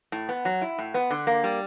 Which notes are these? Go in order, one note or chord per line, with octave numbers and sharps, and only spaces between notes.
A2
B3
F#3
E4
A2
B3
D3
A#3
G3